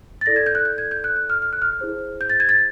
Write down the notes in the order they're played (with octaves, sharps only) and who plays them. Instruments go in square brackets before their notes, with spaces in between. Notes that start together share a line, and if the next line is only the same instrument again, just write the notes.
[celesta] A6
E4 A4 D5 A#6
G#6
G6
F#6
G6
G#6
G6
F#6
F#6
F6
F6
F#6
F6
E4 G#4 C5
G6
A6
G#6
A6